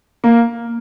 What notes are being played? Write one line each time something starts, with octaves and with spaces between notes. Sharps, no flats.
A#3